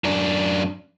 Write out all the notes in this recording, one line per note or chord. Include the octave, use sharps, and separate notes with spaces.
F#2 D4